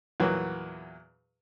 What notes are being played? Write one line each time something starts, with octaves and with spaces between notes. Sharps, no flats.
E2 A#2 E3 F#3